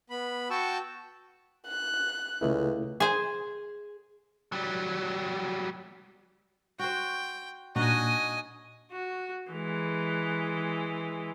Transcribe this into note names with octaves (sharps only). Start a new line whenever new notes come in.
B3 B5
F#4 G5 A5 C#6 E6
F#6
C#2 C#3 A3 E4
G#4 C5
F#3 G3
F#4 C5 G5
A#2 D4 D#4 F#4 D#5 G#5
F#4
E3 G#3